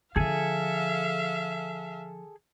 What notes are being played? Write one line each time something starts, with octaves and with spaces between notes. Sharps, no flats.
D3 F3 G#4 A4 E5 F5 G#5